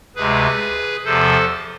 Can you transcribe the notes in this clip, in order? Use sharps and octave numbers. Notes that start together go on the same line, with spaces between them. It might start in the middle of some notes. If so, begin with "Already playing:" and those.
D2 C3 G#3 G#4 B4
E2 C3 F3 A4 C5